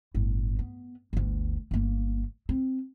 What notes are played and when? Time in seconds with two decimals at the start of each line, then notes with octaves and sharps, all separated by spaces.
0.15 G1 A2
0.59 B3
1.13 G1 D2
1.71 G1 A#3
2.49 C4